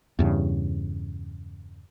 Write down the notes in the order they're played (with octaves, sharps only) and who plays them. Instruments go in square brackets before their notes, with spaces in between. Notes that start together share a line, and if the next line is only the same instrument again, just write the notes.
[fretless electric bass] E2 G2 C#3